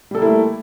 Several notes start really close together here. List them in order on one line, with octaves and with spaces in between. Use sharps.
G3 A4 A#3 E4 A3